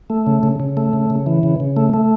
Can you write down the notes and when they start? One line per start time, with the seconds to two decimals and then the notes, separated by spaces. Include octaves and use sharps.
0.10 A3
0.27 C#3
0.43 C#3
0.60 C#3
0.77 A3
0.93 C#3
1.10 C#3
1.26 E3
1.43 C#3
1.60 C#3
1.77 A3
1.94 A3